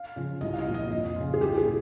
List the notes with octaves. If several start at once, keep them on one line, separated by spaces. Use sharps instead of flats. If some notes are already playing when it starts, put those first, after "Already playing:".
Already playing: F5
C#3 F3
C2 D#5
F5
D#5
A#2 F3
D#5
F2 D#5
C#3 F3 F4
G#4
C2 G4
G#4
A#2